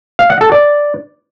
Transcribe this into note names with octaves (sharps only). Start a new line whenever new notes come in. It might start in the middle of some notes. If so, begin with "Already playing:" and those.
F5
F#5
A4
D5